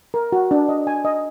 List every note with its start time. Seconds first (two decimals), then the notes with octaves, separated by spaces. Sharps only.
0.14 A#4
0.32 F#4
0.51 D4
0.69 D#5
0.87 G#5
1.05 D#5